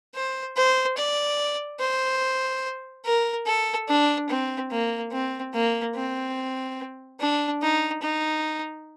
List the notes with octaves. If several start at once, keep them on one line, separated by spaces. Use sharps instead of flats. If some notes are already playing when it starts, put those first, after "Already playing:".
C5
C5
D5
C5
A#4
A4
D4
C4
A#3
C4
A#3
C4
D4
D#4
D#4